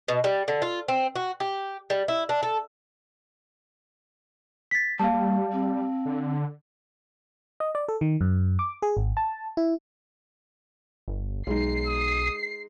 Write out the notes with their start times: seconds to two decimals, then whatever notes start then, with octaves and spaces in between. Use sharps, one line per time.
0.08 B2
0.24 G3
0.48 D3
0.62 F4
0.88 C4
1.15 F#4
1.40 G4
1.90 G3
2.08 E4
2.29 D4
2.43 A4
4.71 A6 B6
4.99 G3 A#3 F5 A5
5.13 G3
5.52 C4
6.05 D3
7.60 D#5
7.75 D5
7.88 A4
8.01 D#3
8.21 F#2
8.59 D6
8.82 G#4
8.97 G#1
9.17 A5
9.57 E4
11.08 G1
11.47 B1 G#3 D#4 C7
11.87 D#6